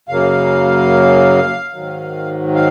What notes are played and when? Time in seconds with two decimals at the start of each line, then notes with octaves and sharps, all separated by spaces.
0.09 F#2 C#3 F#3 A#3 F5
1.73 G#2 D#3 F#3
2.55 F5